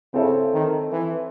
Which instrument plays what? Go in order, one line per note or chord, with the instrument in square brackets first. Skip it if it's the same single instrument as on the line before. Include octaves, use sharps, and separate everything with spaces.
[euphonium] C#3 [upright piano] C4 E4 A4 C#5 E5
[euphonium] D#3
E3